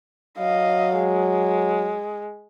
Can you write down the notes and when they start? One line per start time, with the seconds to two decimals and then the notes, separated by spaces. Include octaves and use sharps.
0.39 F#3 D#5 F5
0.99 G#3